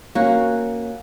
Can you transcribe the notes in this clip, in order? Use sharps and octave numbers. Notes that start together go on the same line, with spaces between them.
A#3 C#4 F#4